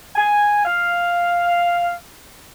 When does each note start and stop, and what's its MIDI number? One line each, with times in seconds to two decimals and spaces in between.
0.16 0.61 80
0.65 1.93 77